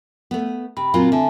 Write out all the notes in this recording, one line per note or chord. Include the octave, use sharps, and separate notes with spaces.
A3 B3
C3 B5
A#2 F#3 C4 F4
D3 E5 G#5 A5